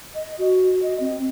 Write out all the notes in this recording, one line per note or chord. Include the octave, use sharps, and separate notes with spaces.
D#5
F#4
D#5
C4